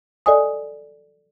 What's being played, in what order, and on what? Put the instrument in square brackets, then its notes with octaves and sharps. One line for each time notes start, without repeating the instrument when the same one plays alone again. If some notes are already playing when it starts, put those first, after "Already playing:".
[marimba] A4 D5 D#5 G#5 D#6